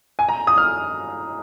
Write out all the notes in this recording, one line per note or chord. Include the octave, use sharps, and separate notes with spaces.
G#5
A#5
D#6
F6